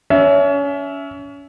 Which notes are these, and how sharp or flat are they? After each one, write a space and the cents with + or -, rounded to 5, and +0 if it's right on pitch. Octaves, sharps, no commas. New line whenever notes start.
C#4 +30 E5 +5